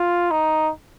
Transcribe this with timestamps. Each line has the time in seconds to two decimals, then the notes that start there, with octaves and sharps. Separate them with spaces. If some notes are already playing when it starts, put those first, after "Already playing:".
Already playing: F4
0.31 D#4